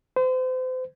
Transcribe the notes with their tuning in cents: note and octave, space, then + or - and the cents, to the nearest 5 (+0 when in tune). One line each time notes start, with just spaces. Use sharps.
C5 -35